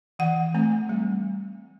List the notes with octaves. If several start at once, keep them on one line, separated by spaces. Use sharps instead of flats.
E3 F#5
A3 C4
G3